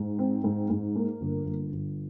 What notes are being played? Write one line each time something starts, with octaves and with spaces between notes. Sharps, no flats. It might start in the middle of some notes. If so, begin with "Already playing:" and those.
Already playing: G#2
C4
G#2
G#2
A#3
G1
G1
G1